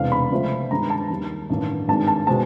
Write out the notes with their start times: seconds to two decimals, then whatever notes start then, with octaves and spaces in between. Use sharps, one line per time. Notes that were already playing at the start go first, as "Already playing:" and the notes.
Already playing: E1 E2 C3 E3 F5
0.12 B5
0.31 C#2 C3 F3 A3 C4
0.70 G2 D#3 G#3 A#5
0.90 A5
1.10 D#2 D#3 G3
1.50 A1 G2 D#3
1.88 G#1 G2 D#3 G#3 A5
2.08 A5
2.27 B2 G#3 C4 A5